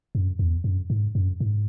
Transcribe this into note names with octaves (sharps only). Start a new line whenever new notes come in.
F#2
E2
F#2
G#2
F#2
G#2